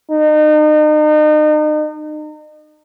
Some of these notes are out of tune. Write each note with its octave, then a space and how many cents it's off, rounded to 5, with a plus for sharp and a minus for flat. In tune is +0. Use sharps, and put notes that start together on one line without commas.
D#4 -35